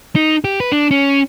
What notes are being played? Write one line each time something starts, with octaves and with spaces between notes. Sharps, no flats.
D#4
G4
B4
D4
C#4